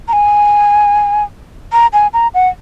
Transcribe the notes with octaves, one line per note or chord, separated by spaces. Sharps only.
A#5
G#5
A#5
G#5
A#5
F#5